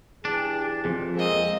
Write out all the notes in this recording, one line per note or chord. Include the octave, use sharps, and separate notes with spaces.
E3 D4 G4 G#4
F2 F3 G#4
G#3 A#3 C4 G#4 D#5